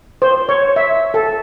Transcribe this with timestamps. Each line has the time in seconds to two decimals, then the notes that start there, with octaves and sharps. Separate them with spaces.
0.22 C5
0.49 C#5
0.76 E5
1.14 A4